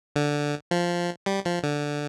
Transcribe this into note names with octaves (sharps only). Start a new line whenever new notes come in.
D3
F3
G3
F3
D3